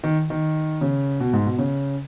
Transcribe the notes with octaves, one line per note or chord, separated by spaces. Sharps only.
D#3
D#3
C#3
B2
G#2
B2
C#3